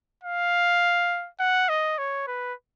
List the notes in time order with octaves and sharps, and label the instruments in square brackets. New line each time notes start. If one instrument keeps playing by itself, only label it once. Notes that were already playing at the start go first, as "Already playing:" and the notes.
[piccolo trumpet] F5
F#5
D#5
C#5
B4